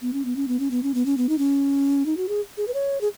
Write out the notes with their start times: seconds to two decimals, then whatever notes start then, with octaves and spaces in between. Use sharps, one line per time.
0.02 B3
0.13 C#4
0.25 B3
0.36 C#4
0.48 B3
0.60 C#4
0.71 B3
0.83 C#4
0.94 B3
1.06 C#4
1.17 B3
1.29 D#4
1.38 C#4
2.06 D#4
2.17 F#4
2.29 G#4
2.57 G#4
2.68 B4
2.74 C#5
3.01 G#4